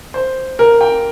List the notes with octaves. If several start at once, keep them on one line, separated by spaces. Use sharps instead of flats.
C5
A#4
G5